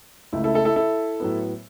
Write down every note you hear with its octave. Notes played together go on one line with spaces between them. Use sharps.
C#2 C#3 A3 E4
E4 A4
E4 A4
E4 A4
E4 A4
A2 F#3 B3